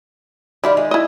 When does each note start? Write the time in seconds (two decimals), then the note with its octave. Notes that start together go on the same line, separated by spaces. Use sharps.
0.64 D#3 G3 E4 F4 D5
0.77 G#3
0.91 E4 D#5